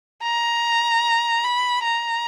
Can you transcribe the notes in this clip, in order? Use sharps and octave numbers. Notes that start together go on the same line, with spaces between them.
A#5
B5
A#5